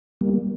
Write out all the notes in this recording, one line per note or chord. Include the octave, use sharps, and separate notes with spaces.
G3 A#3